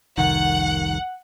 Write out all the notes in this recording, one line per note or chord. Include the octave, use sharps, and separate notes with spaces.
F1 C2 D#3 F#5